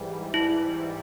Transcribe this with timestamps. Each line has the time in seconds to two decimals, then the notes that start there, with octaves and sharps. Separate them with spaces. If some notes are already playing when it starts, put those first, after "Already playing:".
Already playing: G#2 E3 G3
0.34 E4